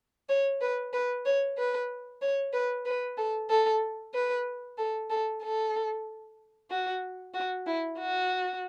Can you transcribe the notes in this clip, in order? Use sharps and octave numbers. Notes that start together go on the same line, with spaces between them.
C#5
B4
B4
C#5
B4
C#5
B4
B4
A4
A4
B4
A4
A4
A4
F#4
F#4
E4
F#4